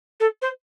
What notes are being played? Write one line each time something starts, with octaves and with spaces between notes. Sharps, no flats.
A4
C5